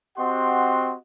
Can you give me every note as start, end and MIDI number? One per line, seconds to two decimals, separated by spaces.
0.18 0.95 60
0.18 0.95 66
0.18 0.95 67
0.18 0.95 75
0.18 0.95 78
0.18 0.95 84